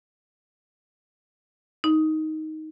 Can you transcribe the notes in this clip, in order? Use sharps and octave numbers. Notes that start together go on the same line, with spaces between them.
D#4